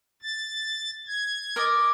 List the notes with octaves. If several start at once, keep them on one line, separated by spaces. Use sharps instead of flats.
A6
G#6
A#4 D5 D#5